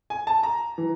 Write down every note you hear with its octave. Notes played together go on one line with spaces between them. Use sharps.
G#5
A5
A#5
E3